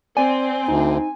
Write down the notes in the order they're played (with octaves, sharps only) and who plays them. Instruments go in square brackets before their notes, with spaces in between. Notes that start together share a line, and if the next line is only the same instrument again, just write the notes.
[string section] C4 [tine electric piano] D5 [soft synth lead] G#5
[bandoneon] D2 [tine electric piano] D#4